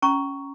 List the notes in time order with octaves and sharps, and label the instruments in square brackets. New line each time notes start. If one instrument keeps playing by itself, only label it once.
[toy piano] C#4 A#5 C#6